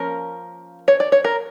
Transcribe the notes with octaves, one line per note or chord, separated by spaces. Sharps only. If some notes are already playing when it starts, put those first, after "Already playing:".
Already playing: F3 A#3 C#4 A#4
C#5
D5
C#5
A#4